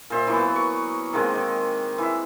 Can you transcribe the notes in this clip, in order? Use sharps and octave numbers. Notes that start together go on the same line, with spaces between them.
A#2 C5 E5
E3 F#3 A#3 B3
C#6
D#3 G#3 A#3 C4
D#3 D#4
E3 E5